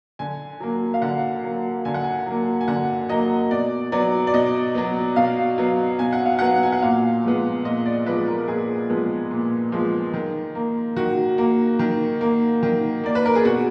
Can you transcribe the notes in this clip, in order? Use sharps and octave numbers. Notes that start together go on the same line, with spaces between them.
D3 G#5
F#3 A#3
F5
D3 F#5
F#3 A#3
D3 G#5
F#5
G#5
F#3 A#3
G#5
D3 F#5
F#3 A#3 D#5
B2 D5
F#3 B3 D5
D5
B2 D#5
F#3 B3
B2 F5
F#3 B3
B2 G#5
F#5
F5
F#3 B3 F#5
G#5
F#5
A#2 F5
F3 G#3 B3
A#2 D#5
D5
F3 G#3 B3 B4
A#4
A#4
A#2 G#4
F3 G#3 B3
A#2
F3 G#3 B3
D#3
A#3
D#3 F#4
A#3
D#3
A#3
D#3
A#3 D5
B4
A#4
G#4
B2 F#4